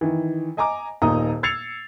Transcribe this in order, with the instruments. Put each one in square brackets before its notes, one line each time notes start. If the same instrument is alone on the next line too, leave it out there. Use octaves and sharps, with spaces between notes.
[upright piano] D#3 E3
D#5 G#5 A#5 D6
D#1 A#2 D#4 A#5 D#6
E6 G#6 A6 C7 C#7 F7